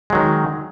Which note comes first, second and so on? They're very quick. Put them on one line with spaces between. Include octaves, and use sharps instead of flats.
G#3 F#3 D#3